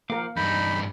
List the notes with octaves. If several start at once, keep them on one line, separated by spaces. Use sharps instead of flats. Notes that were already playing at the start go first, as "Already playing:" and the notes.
F3 A#3 A#4 F5 D6
E2 G2 D#4 B5